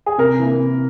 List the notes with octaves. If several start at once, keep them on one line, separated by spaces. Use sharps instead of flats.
G#4
C3 A#4
E3 A#3 E4
C3